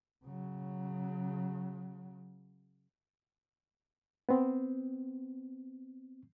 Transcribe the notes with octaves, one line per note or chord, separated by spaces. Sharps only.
C#3 F#3
B3 C4